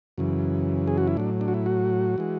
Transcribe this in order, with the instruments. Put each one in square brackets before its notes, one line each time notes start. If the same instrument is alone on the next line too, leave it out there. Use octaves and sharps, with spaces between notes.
[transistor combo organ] F#2 C#3 E3
G#4
F#4
E4
A2 F#3 D4
D4
F#4
E4
F#4
E3 G#3